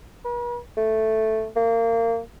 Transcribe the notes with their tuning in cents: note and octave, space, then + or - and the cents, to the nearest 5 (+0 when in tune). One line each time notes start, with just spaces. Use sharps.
B4 -45
A3 +0
A#3 -25